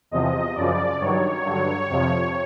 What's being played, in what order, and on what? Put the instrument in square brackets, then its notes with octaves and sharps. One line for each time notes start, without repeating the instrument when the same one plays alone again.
[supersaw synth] E2 C3 F3 D#5
F#2 C#3 F3 D5
G2 D#3 F#3 C#5
G2 D3 F#3
F2 C3 F3